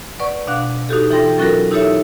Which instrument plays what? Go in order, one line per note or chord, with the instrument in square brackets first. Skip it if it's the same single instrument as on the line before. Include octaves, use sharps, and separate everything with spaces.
[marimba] B4 D5 F#5 C#6
B2 D4 F5 F#5 F#6
D#4 F#4 G4 A4
E3 F4 A4 G5 C6 A#6
F#3 C#4 F4 F#4 A4 A#4
D#4 E4 G4 A4 C#5 E5